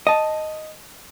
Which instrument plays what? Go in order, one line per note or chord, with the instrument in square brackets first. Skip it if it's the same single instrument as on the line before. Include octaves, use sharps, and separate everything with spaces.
[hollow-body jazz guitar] D#5 A5